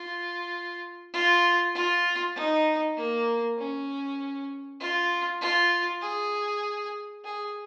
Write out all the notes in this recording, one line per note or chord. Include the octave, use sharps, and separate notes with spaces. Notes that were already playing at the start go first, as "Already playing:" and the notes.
Already playing: F4
F4
F4
D#4
A#3
C#4
F4
F4
G#4
G#4